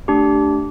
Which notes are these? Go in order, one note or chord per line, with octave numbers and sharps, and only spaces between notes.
A3 D4 G4